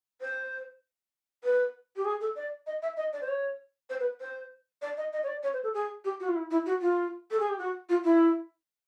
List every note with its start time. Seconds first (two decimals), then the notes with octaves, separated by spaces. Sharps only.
0.21 C5
1.44 B4
1.97 G4
2.05 G#4
2.21 A4
2.36 D5
2.67 D#5
2.82 E5
2.97 D#5
3.13 D5
3.22 C5
3.28 C#5
3.90 C5
4.00 B4
4.20 C5
4.82 D5
4.97 D#5
5.13 D#5
5.23 C#5
5.28 D5
5.43 C#5
5.53 C5
5.64 A4
5.74 G#4
6.05 G4
6.20 F#4
6.28 F4
6.36 E4
6.51 E4
6.66 F#4
6.81 F4
7.31 A4
7.40 G#4
7.49 G4
7.58 F#4
7.89 F4
8.04 E4